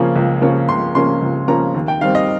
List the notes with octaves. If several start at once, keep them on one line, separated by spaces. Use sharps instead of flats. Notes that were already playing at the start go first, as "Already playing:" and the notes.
Already playing: C#3 F3 A#3 C#4
C#2
C#3 F3 A#3 C#4
C#2 C6
C#3 F3 A#3 C#4 C6
C#2
C#3 F3 A#3 C#4 A#5
D#2
G5
D#3 G3 C4 F5
D#5